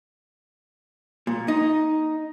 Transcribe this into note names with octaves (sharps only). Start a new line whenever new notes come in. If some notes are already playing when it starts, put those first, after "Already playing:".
A#2
D#4